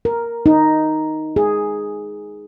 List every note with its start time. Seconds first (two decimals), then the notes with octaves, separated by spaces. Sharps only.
0.05 A#4
0.46 D#4
1.36 G#4